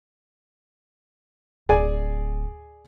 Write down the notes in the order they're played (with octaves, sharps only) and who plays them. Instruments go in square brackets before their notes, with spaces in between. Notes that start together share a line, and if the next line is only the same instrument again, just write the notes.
[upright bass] D1 [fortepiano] G#4 D5 G#5